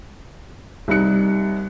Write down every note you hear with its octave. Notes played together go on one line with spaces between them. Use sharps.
C2 G3 D#4 F#6 C#7